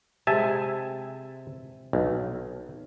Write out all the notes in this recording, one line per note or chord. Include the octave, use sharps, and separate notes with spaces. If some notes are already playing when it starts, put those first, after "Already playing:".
C3 G#3 E5 G#5 A5
B1